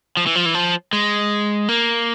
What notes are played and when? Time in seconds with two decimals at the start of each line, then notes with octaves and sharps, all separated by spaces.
0.17 F3
0.26 E3
0.36 F3
0.45 E3
0.54 F3
0.93 G#3
1.69 A#3